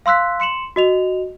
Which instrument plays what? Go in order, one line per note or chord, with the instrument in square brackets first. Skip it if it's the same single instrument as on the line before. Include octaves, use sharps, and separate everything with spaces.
[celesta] F5 C6 E6 F#6 B6
C6 C#7 E7 F#7
F#4 D#5 F7